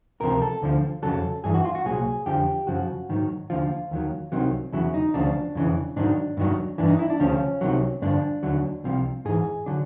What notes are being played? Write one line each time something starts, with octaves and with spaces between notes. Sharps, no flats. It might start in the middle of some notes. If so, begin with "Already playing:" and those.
C#2 C3 F3 A#4
A4
D2 D3 F3
F2 C#3 F#3 A4
G2 E3 G#4
F#4
F4
F#4
C2 A#2 F#3 G#4
F2 D3 F3 G4
F#2 C#3 F3 F#4
G#2 D#3 F#3
D#2 D3 F3 F4
D#2 D#3 F#3
C2 C3 D#3 F#3
E2 C#3 F#3 E4
D#4
D2 C#3 F3 D4
F2 C#3 E3
G#2 D#3 F#3 D4
G2 D#3 F#3
G2 E3 D4
D#4
E4
D4
D2 C#3 F3 C#4
C2 C3 D#3 F#3
G2 D3 F3 D4
D#2 D3 F#3
C2 C3 F3
G#2 E3 G#4
D3 F#3 D4